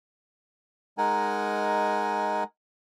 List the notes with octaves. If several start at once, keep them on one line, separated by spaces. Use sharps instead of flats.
G#3 D#4 A#4 F#5 G#5